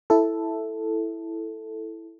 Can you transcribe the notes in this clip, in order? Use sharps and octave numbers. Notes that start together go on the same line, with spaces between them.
E4 A4